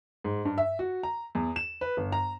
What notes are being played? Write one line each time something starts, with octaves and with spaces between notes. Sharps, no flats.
G#2
G2
E5
F#4
A#5
E2
E7
B4
G1
A#5